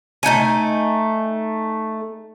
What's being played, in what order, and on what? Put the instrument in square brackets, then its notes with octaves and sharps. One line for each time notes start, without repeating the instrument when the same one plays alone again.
[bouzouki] A3 D#4 F#5 G#5